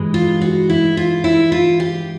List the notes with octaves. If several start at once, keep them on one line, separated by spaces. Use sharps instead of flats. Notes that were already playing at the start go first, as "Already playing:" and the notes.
Already playing: G2 E3 G#3
F4
F#4
E4
F4
E4
F4
G4